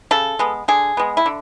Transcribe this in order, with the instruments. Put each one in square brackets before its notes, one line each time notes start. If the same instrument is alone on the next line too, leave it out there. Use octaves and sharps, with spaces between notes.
[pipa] C#3 A4
G#3 B3
D3 G#4
G#3 B3
E4
D3